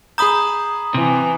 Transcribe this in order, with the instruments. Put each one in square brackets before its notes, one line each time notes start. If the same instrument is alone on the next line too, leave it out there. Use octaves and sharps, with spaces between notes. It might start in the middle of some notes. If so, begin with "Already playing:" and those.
[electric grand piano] G#4 B5 G6 [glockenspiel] A#5 D#6
[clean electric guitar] C3 [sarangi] E3